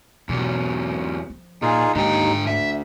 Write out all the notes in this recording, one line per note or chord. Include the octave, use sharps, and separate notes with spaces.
E2 B2 F#3
F3
A#2 D#4 F4 G#4
D#2 G#2 D3 D#4 G5
D2 E5